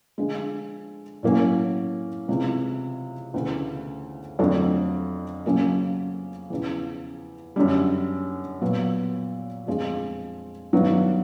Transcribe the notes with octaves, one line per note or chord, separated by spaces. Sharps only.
D3 F3 G#3
A2 F#3 A#3 C#4
C#2 C3 E3
D2 C#3 E3 A3
F2 D3 F#3 A3 D4
C#3 F#3 A#3 C#4 F4
E2 C#3 F3
F#2 D3 G3
A#2 F#3 B3
F2 D3 F3 G#3
G2 D#3 F#3 B3